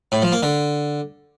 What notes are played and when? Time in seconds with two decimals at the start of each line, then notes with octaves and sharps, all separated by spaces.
0.12 A2
0.22 F3
0.32 A#3
0.43 D3